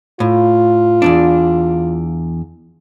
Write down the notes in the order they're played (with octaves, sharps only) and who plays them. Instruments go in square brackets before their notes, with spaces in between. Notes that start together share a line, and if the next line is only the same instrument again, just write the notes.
[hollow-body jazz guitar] A2 [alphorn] F4
[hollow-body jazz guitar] E2 G#2 D4